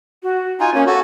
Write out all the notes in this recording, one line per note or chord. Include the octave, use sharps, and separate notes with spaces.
F#4
D#4 F4 G#5
A#3 C#4
F#4 A4